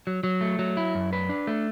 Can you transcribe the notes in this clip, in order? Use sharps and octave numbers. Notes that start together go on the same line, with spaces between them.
F#3
F#3
A3
F#3
E4
F#2
B4
D4
A3